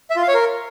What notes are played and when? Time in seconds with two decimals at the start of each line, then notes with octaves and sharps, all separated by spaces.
0.10 E5
0.16 F4
0.22 F5
0.28 C#5
0.34 A#4